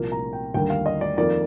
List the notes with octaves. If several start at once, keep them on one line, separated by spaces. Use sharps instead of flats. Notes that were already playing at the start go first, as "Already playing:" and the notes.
Already playing: C2 A#2 F3 A#3
A#5
G5
D#2 D3 G3 A#3 G5
F5
D#5
D5
F2 D#3 A#3 D5